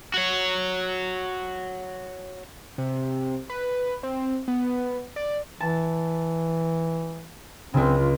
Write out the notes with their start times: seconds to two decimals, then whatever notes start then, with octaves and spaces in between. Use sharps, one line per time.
0.14 F#4 C#5
2.78 C3
3.50 B4
4.03 C4
4.48 B3
5.16 D5
5.60 E3 A5
7.74 C#2 C#3 C4
7.98 F4